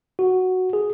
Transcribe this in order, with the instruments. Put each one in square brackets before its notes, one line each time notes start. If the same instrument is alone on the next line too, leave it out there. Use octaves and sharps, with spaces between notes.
[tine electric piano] F#4
G#4